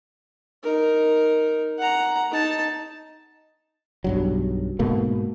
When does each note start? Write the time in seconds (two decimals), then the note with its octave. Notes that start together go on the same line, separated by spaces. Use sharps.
0.63 D#4 A#4
1.79 F#5 A#5
2.32 D#4 A5
4.04 B1 G2 F#3
4.79 G#2 B2 A3 A#3